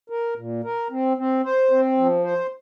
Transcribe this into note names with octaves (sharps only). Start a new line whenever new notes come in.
A#4
A#2
A#4
C4
C4
C5
C4
F3
C5